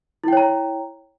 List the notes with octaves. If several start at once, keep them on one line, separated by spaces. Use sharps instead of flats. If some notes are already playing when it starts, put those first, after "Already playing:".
E4 C#5 G5 A#5